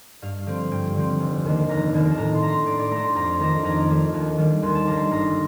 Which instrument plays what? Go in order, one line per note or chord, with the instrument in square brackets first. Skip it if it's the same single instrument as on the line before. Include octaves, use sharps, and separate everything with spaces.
[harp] G2 F5
D3 F3 C4
G2 G5
D3 F3 C4
F1
D#2 D#3 A#3 D4
F1 A#5
D#2 D#3 A#3 D4
A5
A2 A#5
C6
A3 D4 A#5
C6
A2 D5
D5
A3 D4 A#5
C6
F2 A#5
D#3 A3 D4 A#5
F2 A#5
D#3 A3 D4
D#2
D#3 G3 D4
D#2 C6
A5
D#3 G3 D4 A#5
C6
G1 A#5